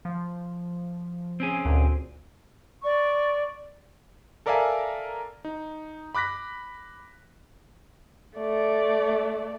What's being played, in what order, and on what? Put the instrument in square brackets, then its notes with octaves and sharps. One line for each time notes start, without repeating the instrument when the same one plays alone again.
[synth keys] F3
[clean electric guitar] C4 C#4 G#4
[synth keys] D2 A#2
[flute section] D5 C#6
[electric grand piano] A4 A#4 D5 E5 F5 G#5
D#4
B5 D6 F#6 A#6 B6
[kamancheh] A3 D5